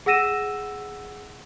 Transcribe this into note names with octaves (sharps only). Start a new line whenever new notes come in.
G#4 F#5 E6 A#6 D#7 E7